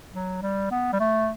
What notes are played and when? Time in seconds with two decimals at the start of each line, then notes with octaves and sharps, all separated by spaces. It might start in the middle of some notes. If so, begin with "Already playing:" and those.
0.13 F#3
0.42 G3
0.71 B3
0.93 G3
1.00 A3